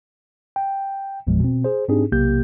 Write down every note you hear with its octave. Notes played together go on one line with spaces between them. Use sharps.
G5
G#1 E2 A#2 F3 G#3
B2 C4
G#4 C5
G#2 C4 D4 D#4 G4 G#4
B1 C3 A#3 G4 G6